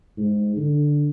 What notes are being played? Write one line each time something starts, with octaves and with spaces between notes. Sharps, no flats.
G#2
D3